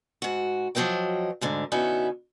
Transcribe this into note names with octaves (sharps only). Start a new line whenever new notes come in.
G#2 F#4
F3 F#3 E4 C5 D#5 G5
D2 G#2 D3
D3 B3 C#4 D#4 E4 F#4